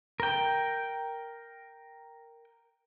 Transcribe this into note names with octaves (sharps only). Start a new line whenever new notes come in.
A#4 G5